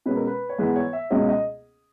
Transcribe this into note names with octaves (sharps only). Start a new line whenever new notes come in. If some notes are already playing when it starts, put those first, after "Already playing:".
B2 G#3 C#4 B4
A#4
B4
C#5
G#2 E3 G#3 B3 B4
C#5
E5
C#2 B2 G#3 C#4 D#5
D#5